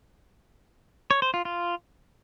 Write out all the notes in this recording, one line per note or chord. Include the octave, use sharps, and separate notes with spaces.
C#5
C5
F4
F4